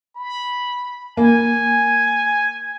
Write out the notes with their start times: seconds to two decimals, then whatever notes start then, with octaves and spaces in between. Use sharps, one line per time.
0.16 B5
1.17 A#3 G#5